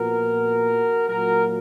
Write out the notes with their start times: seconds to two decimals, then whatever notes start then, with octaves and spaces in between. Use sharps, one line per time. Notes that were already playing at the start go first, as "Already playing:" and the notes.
Already playing: A#2 F3 B3 F#4 A#4
1.07 A#2 F#3 A#3 F#4 A#4